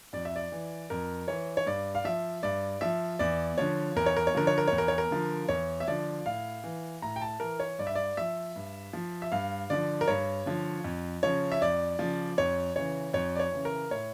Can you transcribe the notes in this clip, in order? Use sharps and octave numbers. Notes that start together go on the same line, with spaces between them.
F2 D5
E5
D5
E3
F2 A#4
E3 C#5
C#5
G2 D5
F5
F3 E5
G2 D5
F3 E5
E2 D5
D3 F3 C#5
E2 A#4
C#5
A#4
C#5
D3 F3 A#4
C#5
A#4
E2 C#5
A#4
C#5
A#4
D3 F3
E2 C#5
E5
D3 F3 D5
A2 F5
E3
A2 A#5
G5
A5
E3 A#4
C#5
G2 D5
E5
D5
F3 E5
G2
F3
E5
G2 F5
D3 F3 D5
A#4
G2 C#5
D3 F3
F2
C#3 F3 C#5
E5
F2 D5
C#3 F3
F2 C#5
C#3 E3 C#5
F2 C#5
D5
C#5
C#3 E3
A#4
A2 C#5